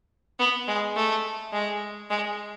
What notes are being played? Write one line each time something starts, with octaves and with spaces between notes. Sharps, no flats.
B3
G#3
A3
G#3
G#3